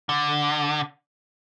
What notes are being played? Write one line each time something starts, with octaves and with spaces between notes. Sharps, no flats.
D3